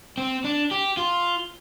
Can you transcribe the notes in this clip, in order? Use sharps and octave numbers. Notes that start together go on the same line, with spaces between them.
C4
D4
G4
F4